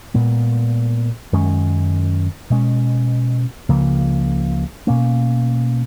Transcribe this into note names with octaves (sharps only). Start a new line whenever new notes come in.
A#2 G#3 B3
F#2 D#3 G#3 C#4
B2 G#3 C#4
C#2 C#3 F3 A#3
B2 A#3 C#4